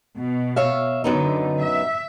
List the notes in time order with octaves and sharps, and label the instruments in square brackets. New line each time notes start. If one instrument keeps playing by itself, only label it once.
[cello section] B2
[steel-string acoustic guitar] C#5 E5 F5
[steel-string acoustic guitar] F#2 B3 D#4 [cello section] D3
[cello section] E5